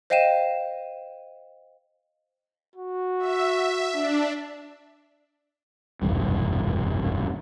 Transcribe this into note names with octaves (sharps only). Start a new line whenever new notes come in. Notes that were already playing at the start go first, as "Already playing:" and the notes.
C5 D#5 F5 G5 D#7 E7
F#4
E5
D4
F1 B1 E2 G2